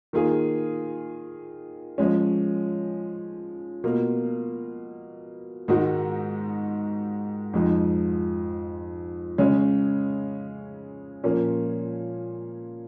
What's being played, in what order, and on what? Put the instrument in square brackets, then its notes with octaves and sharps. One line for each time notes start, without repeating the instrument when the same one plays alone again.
[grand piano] D#3 A#3 F4 G#4
F3 G#3 C#4
B2 A#3 F4
G#2 D#3 G#3 D#4 F#4
F2 F3 G#3 D#4
C#3 G#3 C#4
A#2 F3 A#3 C#4